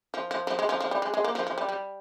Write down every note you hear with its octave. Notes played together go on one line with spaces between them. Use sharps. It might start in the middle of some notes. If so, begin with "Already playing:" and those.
F3
F3
F3
G#3
F3
F3
G3
G#3
G#3
A#3
F3
F3
G3
G3